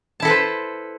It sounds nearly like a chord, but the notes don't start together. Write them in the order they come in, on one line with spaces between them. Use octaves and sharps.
A5 E4 A4 B4 C5